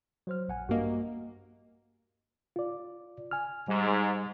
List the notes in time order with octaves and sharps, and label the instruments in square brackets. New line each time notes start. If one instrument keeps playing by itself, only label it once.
[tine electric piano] F#3 C5 F6
A#1 F#5 G#5
[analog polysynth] G2 A#3 [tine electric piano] F#4 D#5
[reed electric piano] F4 D5
G#5 F6
[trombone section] G#2 [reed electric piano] G3